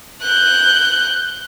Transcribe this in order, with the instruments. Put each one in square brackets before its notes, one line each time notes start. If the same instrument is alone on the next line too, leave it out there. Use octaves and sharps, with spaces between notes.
[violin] F#6 G6